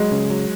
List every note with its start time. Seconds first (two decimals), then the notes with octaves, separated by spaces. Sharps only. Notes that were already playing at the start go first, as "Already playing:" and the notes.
Already playing: F#3 G#3
0.11 C#3
0.30 F#3